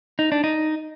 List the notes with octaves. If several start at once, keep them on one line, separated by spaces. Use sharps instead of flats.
D#4
D4
D#4